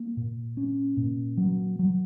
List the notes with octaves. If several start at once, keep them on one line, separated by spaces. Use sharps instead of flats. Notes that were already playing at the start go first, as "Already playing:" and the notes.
Already playing: A#3
A#2
C#4
A#2
F#3
F#3